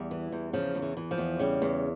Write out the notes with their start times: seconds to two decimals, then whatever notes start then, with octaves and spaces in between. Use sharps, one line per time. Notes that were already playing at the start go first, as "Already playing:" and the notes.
Already playing: E2 G3
0.11 E3
0.32 E2
0.53 C#3 F3
0.75 E2
0.82 E3
0.97 E3
1.11 F3
1.18 E2
1.39 C#3 G3
1.62 E2